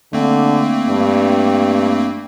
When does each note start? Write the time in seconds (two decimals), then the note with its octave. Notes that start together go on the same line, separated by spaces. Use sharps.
0.13 D3 A3 A#3 C4
0.88 G2